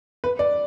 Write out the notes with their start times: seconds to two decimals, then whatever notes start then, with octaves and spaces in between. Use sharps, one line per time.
0.24 B4
0.39 D5